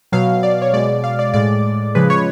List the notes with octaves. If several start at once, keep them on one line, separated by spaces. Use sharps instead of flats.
B2 F#3 F5
D5
C#5
B2 G#3 D5
F5
D5
A2 G#3 D5
C#3 F3 G#3 B4
C#5